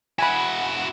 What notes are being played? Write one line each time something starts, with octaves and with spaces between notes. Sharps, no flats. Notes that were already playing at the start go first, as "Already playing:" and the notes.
E4 F#4 G#5 B5